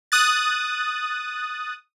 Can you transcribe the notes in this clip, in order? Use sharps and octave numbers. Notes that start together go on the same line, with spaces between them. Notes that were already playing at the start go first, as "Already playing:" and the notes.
D#6 F#6 A6